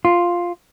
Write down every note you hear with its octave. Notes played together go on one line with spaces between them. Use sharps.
F4